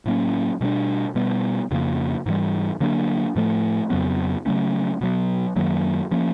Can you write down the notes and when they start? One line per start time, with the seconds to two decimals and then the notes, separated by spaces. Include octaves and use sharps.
0.05 A2 F#3 A#3 C#4
0.61 B2 G3 B3 D4
1.15 B2 G3 B3
1.71 F2 C#3 F3 A#3
2.26 G#2 E3 G3
2.80 D3 F#3 A#3 D4
3.36 A2 F3 A3
3.90 F2 C#3 F#3 B3
4.46 C#3 F#3 A3 C#4
5.01 B2 F#3 B3
5.56 F#2 D#3 F#3 A#3
6.11 F3 A#3 C#4